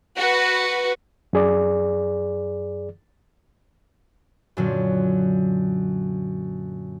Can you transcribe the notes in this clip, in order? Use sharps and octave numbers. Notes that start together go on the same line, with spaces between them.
F#4 B4
F#2 G#4 D5
F#2 A#2 D3 F#3